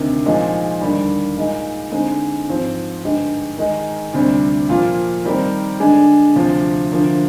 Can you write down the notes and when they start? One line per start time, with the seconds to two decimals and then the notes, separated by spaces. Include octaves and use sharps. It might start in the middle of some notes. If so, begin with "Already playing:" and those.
Already playing: D2 C3 D#3
0.26 A#2 F3 G#3 D#4
0.81 D#2 D3 G3
1.37 A#2 G#3 D#4
1.92 D3 G#3 C4 D#4
2.48 G#2 F3 C4
3.03 G2 D3 G#3 D#4 G4
3.58 D#3 G#3 D#4 A#4
4.13 D2 C3 G3 C4
4.69 A#2 F3 A#3 F4
5.25 D#3 G3 C4 G4 A#4
5.80 D3 G#3 D4 G#4
6.36 D2 C3 F3
6.91 D2 D3 F3 A#3